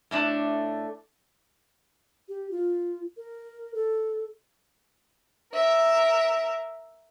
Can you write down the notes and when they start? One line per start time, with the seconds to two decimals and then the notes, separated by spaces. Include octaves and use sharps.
0.11 A2 A3 D4
2.29 G4
2.51 F4
3.17 A#4
3.75 A4
5.54 A#4 E5